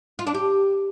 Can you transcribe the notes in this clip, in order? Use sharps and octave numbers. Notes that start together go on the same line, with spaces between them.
F4
D4
G4